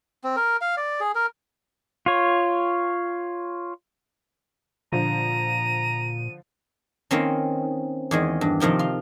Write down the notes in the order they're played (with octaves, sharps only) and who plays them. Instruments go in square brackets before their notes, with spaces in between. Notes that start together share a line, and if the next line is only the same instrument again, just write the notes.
[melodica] C4
A#4
F5
D5
G#4
A#4
[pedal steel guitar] F4 C#5
[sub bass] A#2 [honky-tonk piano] D3 F3 [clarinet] A#5 [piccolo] D#7
[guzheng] D#3 A#3 C4 C#4
E2 D#3 G#3
G2
C3 D#3 F3 G5
F4